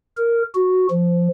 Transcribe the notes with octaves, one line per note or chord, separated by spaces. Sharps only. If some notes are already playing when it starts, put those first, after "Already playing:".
A#4
F#4
F3